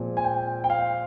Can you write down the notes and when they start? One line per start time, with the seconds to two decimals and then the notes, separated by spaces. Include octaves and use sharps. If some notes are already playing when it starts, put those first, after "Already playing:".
Already playing: A#2 F3 G#3 C4
0.17 G#5
0.24 G5
0.64 G5
0.70 F5